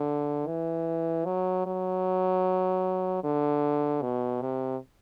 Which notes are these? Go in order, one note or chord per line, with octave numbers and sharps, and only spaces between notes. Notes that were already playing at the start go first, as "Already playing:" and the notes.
Already playing: D3
E3
F#3
F#3
D3
B2
C3